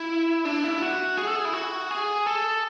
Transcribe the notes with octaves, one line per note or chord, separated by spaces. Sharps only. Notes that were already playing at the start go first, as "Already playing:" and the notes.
Already playing: E4
D4
E4
F#4
G#4
A4
G#4
E4
F#4
G#4
A4